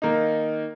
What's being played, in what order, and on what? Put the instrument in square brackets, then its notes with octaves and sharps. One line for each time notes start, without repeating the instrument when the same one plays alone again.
[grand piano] D#3 A#3 D#4